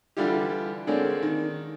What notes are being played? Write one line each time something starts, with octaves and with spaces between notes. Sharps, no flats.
D3 E3 G3 E4 F4 G4
D3 G#3 A#3 C4 C#4 D5
D#3